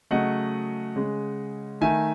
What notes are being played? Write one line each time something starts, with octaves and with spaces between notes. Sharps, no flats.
C#3 F#3 A3 D#5 F#5
C#3 G#3
D#3 A3 E5 G#5